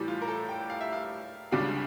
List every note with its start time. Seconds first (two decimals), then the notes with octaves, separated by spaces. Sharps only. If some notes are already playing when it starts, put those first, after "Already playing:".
Already playing: A2 E3 G3
0.08 F4
0.22 A#4
0.28 A4
0.49 G5
0.70 F5
0.81 E5
0.93 F5
1.51 C#2 C#3 G3 D4 F5